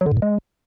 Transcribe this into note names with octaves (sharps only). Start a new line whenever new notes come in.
F#3
D3
G#2
A#2
G#3